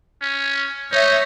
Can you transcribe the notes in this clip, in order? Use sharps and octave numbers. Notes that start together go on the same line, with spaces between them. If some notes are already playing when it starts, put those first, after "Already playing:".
C#4
D#4 C#5 E5